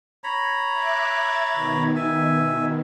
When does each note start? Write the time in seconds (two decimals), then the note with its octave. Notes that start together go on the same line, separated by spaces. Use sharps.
0.24 C#5 A#5 B5
0.72 E5 D6 F#6
1.12 E5 G#6 A6
1.53 B2 D#3
1.96 E5 G#5